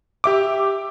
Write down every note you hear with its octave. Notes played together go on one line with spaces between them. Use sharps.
G4 E5 D6